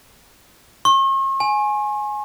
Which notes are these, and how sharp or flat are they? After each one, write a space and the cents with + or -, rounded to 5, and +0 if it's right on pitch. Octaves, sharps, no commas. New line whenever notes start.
C#6 -45
G#5 +10